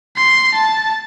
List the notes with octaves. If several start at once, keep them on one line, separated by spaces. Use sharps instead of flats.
C6
A5